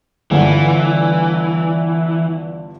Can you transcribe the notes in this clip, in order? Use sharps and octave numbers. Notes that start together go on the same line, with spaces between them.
G1 G2 D3 E3